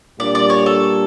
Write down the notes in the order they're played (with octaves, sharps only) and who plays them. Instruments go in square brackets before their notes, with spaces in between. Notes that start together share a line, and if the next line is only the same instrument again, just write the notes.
[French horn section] A#2 G3 D4 [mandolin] D5
[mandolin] D5
C#5
A4